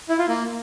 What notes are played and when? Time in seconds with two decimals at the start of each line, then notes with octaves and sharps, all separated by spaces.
0.09 E4
0.19 F4
0.28 A#3